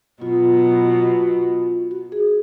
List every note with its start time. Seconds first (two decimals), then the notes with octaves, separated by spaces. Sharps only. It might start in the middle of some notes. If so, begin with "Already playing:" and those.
0.21 B2 F#3 B3 F4
1.91 F#4
2.12 G#4